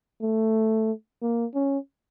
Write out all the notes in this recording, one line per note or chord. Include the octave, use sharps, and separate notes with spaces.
A3
A#3
C#4